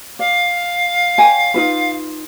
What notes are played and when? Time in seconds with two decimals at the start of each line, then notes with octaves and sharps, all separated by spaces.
0.19 D5 F5
1.18 C#5 G5 G#5
1.54 D#4 F4 B4